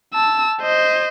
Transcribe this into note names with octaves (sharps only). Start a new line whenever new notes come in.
A5 E6
C5 D#5